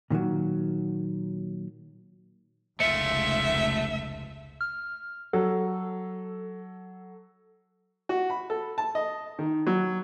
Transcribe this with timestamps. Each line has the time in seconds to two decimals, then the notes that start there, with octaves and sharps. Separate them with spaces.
0.10 A#2 D#3 E3 F#3
2.80 F1 C#2 A3 F4 E5 C#7
4.61 F6
5.33 F#3 A4
8.09 F#4
8.30 B5
8.50 A4
8.78 A5
8.95 D#5
9.39 D#3
9.67 F#3